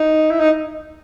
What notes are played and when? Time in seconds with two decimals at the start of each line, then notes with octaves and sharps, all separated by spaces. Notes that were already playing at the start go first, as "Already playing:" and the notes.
Already playing: D#4
0.31 E4
0.40 D#4